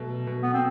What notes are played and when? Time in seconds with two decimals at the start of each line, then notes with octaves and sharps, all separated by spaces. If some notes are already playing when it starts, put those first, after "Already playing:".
Already playing: B2 F#3 A3
0.27 B2
0.42 B3
0.53 C4